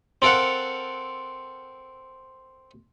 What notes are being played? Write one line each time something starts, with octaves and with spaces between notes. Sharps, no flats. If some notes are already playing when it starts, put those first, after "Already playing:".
C4 A4 A#4 F5 F#5